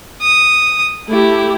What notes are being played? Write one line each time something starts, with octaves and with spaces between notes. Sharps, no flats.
D#6
A3 E4 G4